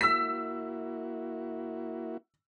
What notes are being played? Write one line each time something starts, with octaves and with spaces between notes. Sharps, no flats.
A#3 E4 F#4 E6 B6